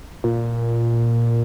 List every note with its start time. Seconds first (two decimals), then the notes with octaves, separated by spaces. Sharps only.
0.24 A#2